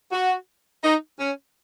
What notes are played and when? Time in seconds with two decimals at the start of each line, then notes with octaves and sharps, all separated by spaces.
0.12 F#4
0.84 D#4
1.20 C#4